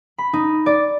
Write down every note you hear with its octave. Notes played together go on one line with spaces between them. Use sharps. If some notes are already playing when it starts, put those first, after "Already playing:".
B5
D#4
D5